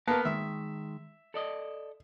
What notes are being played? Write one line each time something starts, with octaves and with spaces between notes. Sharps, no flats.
A#3 B3 A#4 F5 A5
D#3 G#3 E5
A4 D5 D#5